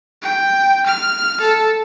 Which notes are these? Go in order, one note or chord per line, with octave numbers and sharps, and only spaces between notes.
G5
F6
A4